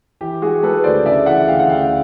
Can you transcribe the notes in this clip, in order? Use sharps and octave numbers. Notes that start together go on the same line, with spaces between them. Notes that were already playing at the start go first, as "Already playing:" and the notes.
E3 G4
G#3 F#4 G#4
G#3 A4 B4
D2 C5 D5
C#3 D5 E5
E3 E5 F#5
D2 F5 G5
F#5
D2 F5 G5